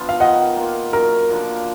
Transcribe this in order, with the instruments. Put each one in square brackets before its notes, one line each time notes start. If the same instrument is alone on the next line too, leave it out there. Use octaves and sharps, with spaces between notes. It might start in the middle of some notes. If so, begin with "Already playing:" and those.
Already playing: [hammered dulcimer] F3 B3 D4 F4
[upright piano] F5
[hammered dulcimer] D#3 [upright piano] D#5 F#5
[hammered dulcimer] A#3 F4
[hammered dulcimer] F#2 [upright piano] A#4
[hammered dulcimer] D3 F3 A#3